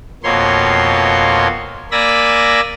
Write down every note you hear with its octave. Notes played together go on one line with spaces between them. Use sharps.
F2 B2 A#3 C#5 C6
A#3 D5 G#5 B5 E6 A#6